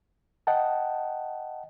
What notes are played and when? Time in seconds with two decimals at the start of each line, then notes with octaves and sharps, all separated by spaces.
0.47 D#5 F#5 G5 A5